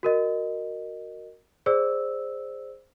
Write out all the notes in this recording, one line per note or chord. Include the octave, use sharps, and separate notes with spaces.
F#4 A#4 D#5
G#4 C5 D5 E6